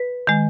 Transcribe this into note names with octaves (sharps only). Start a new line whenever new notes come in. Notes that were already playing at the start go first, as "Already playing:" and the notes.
Already playing: B4
D#3 G#3